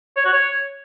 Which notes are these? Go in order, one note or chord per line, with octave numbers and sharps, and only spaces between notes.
C#5
F#4
C#5